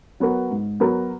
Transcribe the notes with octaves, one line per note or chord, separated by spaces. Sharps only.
F#3 B3 F#4 A#4
G#2
F#3 B3 F#4 A#4